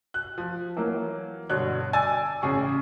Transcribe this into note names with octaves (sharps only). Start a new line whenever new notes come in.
F#6
F3
E3 F#3 A#3
G2 B2 D3 C#5 F#6
D5 G#5 E6 A6
A1 C#3 G#4 C#6